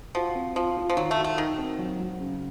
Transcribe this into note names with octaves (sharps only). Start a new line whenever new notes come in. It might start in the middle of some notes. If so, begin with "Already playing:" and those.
F3 F#4
C4
F3 F4
F4
F3
D#3 F#3
A3
F#4
A3
D#3 D#4
C4
F#3
F#3
C#3